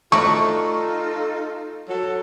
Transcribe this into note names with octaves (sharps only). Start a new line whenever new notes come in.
A3 D#4 F4 F#4 A4 D5 C#6
F#3 A4